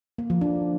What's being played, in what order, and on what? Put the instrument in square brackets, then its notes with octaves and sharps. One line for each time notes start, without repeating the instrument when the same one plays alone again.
[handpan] A#3
F3
D4